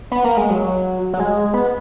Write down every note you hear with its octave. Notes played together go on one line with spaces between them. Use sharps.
B3
A#3
G#3
F#3
F#3
G#3
B3